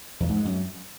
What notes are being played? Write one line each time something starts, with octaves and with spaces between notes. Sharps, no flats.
E2
G#2
G#3
F#2